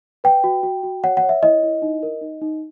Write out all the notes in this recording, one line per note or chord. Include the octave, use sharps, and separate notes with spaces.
B4 G5
F#4
F#4
F#4
C#5 F#5
F#5
C#5
E5
E4 D#5
E4
D#4
A#4
D#4
D#4